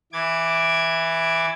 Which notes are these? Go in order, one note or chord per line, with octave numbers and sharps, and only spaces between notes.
E3 D6 G#6